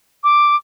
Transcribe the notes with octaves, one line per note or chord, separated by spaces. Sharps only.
D6